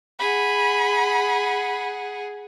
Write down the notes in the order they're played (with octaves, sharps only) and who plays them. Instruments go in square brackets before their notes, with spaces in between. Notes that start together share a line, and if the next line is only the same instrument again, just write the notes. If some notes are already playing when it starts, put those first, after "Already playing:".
[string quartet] G#4 F#5 [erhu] B5